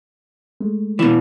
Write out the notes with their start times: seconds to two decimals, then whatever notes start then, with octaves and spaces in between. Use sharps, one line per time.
0.61 G#3 A3
0.99 B2 E3